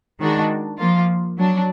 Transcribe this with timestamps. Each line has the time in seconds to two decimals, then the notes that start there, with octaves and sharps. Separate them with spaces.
0.20 D#3 G#3 D4 F#4
0.79 F3 A#3 F4
1.38 F#3 D4